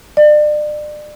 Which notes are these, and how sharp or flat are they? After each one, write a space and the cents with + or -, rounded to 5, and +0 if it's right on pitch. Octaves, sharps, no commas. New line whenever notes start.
D5 +35